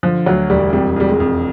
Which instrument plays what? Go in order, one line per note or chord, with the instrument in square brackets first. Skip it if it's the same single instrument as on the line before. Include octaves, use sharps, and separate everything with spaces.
[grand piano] D3 [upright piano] F3
[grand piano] D2 [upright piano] F#3
[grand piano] E1 [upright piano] G3
[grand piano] F2 [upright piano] G3
[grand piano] F2 [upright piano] G3
[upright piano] G#3
[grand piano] F2